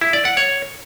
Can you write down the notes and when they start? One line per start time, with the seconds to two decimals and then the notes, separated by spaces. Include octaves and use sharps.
0.01 E4
0.13 D5
0.25 F#5
0.37 C#5